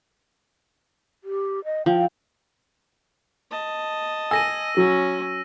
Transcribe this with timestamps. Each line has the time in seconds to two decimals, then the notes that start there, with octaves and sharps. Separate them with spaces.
1.24 G4
1.64 D#5
1.86 F3 G5
3.51 D#5 A5
4.31 G#5 E6 A#6 D#7
4.77 F#3 C#4